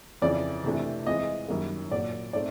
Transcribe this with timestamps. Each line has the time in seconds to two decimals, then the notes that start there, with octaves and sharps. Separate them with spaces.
0.22 F2 C#3 E3 D5
0.64 C3 E3 A3 D4
1.06 E3 G#3 C4 D#5
1.48 F#2 D#3 G3 A#3
1.91 A#2 F#3 A#3 D5
2.33 A3 C4 D#4 D5